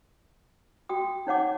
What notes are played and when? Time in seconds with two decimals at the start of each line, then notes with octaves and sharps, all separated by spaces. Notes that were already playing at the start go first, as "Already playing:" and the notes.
0.89 F#4 G5 D#6
1.27 D#4 C#5 F#5 D6